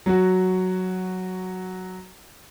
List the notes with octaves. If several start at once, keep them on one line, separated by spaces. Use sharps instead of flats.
F#3 F#4